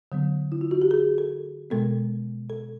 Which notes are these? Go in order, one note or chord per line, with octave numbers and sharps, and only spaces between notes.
D3 F#3 B3
E4
F4
F#4
G4
G#4
A4
B2 G#3 B3 A4
A4